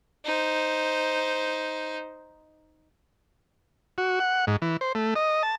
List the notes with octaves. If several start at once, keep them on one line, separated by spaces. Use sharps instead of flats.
D#4 C5
F#4
F#5
G#2
E3
C5
A3
D#5
A5